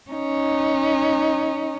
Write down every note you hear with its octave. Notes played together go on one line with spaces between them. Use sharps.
C#4 D#4